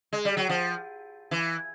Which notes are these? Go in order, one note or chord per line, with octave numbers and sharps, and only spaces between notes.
G#3
G3
F#3
F3
E3